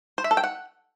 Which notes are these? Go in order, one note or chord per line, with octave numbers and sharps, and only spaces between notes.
C5
E5
A4
G5
F#5